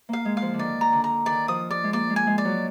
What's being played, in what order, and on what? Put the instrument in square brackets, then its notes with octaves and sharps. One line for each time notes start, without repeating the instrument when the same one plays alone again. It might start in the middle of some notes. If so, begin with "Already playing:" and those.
[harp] A#3 [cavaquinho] F5
[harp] G#3
[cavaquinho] F5
[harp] F3
D3
[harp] D#3 [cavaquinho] D5
[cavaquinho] A#5
[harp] D3
[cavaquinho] A#5
[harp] D#3 [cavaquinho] D5
[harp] F3 [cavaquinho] D#6
[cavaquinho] D5
[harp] G#3
[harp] A#3 [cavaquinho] D5
[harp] G#3
[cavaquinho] G#5
[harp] G#3
[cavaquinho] D5
[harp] F#3